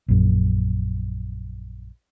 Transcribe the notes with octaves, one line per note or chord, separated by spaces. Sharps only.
A#1 F#2